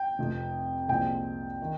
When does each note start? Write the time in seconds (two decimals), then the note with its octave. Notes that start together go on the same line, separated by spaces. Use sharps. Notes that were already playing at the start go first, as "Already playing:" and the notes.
Already playing: G5
0.19 F1 F2 C3
0.89 C2 A#2 F3 G#3 C4 G5
1.62 D#3